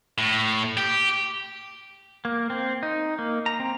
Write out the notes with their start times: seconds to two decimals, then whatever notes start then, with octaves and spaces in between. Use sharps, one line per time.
0.18 A2
0.77 G4
2.25 A#3
2.50 C4
2.83 D#4
3.19 A#3
3.46 A#5
3.60 C4